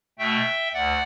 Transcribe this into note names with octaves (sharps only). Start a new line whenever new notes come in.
B2 A3 E5 G5
D2 D5 F#5